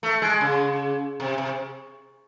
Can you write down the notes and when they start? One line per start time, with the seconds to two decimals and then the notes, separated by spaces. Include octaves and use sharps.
0.03 A3
0.22 G#3
0.41 C#3
1.20 C3
1.38 C3